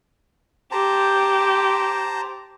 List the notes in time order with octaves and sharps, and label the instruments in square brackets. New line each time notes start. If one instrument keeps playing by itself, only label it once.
[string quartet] G4 [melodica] C5 A5 A#5